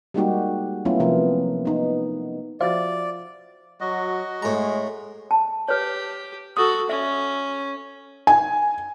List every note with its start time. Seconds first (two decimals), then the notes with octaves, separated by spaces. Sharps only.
0.14 G3 G#3 A#3 D#4 F#4 G4
0.85 F#3 A3 B3 C#4 E4 F4
1.00 C3 F3 A#3 B3 A#4
1.65 B3 D#4
2.61 F3 F#4 C5 D5 E5 F5 A6
3.81 F#3 F#4 D#5
4.42 A2 G#3 A#5
5.31 A5
5.68 G4 B4 C#5
6.57 F#4 A4 D#6
6.89 C#4 E5
8.27 G#5